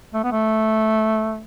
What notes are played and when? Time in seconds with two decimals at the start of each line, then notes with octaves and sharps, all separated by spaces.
0.14 A3
0.24 B3
0.32 A3